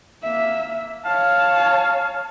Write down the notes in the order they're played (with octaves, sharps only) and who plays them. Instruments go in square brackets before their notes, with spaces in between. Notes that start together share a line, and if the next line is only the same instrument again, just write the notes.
[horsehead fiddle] A#3 E5
[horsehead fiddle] C#5 A5 [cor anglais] F5